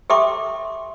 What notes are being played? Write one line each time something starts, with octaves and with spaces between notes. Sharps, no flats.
G4 A4 E5 G5 C6 D6